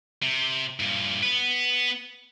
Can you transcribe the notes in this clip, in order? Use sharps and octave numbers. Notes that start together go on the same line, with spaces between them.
C3
G2 A#2
B3 B4